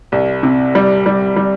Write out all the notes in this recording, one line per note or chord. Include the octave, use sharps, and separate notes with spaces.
C2
C3
G3
G3
G3